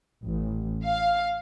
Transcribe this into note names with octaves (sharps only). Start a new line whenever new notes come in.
A1
F5